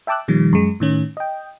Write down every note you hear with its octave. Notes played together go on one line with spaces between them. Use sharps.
E5 G5 A5 D6 E6 F#6
A#2 D#3 F3 G3
F#2 G#3
A2 D#3 C#4
D#5 G5